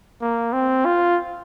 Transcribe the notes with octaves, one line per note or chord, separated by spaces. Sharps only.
A#3
C4
F4